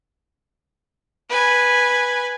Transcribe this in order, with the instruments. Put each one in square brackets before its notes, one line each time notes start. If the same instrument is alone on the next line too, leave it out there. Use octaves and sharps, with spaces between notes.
[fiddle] B4 G#5